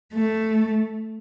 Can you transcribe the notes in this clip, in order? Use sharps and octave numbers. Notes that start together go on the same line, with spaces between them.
A3